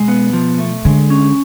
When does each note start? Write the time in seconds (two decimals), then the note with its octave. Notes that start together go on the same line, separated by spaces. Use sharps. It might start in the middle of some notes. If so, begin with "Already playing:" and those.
Already playing: B2 G#3
0.08 B3
0.33 F3
0.59 A3
0.85 D3 G#3
1.10 C#4